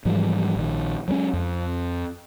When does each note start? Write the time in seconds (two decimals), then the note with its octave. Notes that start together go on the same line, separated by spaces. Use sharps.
0.05 G#2 E3 F3 G3
0.56 A#1 D#3
1.08 F#3 G#3 A3 C#4
1.33 F2